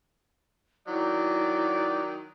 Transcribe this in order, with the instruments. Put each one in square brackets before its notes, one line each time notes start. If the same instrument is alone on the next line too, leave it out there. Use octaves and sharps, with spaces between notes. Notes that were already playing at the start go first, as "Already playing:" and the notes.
[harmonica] D#3 F#3 [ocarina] E4 [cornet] D5